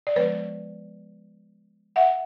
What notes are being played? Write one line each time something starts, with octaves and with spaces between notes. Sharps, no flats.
D5
D3 F3 G#3 B3 B4 C#5
E5 F#5